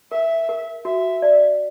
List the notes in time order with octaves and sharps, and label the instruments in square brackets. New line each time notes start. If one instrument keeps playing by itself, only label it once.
[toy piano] A#4 [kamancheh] E5
[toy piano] A#4
[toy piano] F#4 [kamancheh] E5
[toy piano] D5